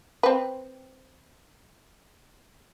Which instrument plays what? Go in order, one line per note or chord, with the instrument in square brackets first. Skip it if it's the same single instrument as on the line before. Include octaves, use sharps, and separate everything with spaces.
[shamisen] C4 B4